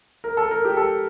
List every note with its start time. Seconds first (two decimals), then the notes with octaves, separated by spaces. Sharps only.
0.24 A#4
0.37 A4
0.51 A#4
0.64 G4
0.77 A4